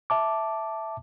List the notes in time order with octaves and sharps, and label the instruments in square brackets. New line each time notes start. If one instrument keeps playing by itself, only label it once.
[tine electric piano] E5 A5 D6